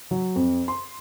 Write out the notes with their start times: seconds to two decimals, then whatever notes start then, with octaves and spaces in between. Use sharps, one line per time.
0.11 F#3
0.36 F2
0.68 C6